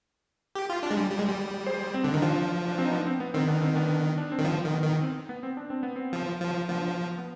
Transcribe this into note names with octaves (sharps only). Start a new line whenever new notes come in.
G4
F4
D4
G#3
G3
G3
G#3
G3
G#4 C5
C4
D3 D4
D#3 D#4
F3 D4 F4
D4
C4
D#4
B3 D4
C4
B3
D#3 C4
B3 D4
C4 D#4
B3 D4
D4
C4
D#3
F3 B3
D#3
B3
D#3
C4
B3
C4
D4
C4
B3
C4
F3
F3
F3 B3 D4
B3